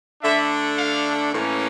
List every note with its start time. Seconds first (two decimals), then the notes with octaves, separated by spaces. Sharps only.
0.22 D3 A3 D4 E5
0.77 F5
1.31 A2 E3 A#3 C#4